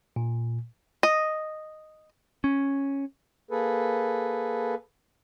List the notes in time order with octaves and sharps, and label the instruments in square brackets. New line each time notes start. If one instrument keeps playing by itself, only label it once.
[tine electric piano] A#2
[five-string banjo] D#5
[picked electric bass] C#4
[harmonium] A#3 G#4 A4 B4